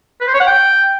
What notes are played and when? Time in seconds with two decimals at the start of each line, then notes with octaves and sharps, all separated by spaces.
0.21 B4
0.27 C5
0.34 C#5
0.40 F#5
0.47 G5